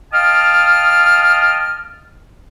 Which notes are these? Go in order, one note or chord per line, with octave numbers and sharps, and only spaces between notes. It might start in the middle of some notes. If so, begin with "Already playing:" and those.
D#5 F5 G5 A5 D#6 F6